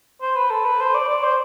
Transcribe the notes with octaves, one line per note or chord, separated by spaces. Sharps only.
C5
B4
A4
B4
C5
D5
D5
C5